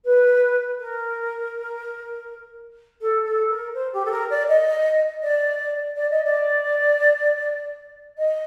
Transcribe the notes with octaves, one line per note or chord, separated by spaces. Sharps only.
B4
A#4
A4
A4
A#4
C5
G4
A4
A#4
D5
D#5
D5
D5
D#5
D5
D#5